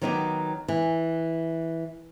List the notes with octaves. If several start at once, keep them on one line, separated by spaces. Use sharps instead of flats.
D#3 F#3 B3 D#4 F#4 G4
E3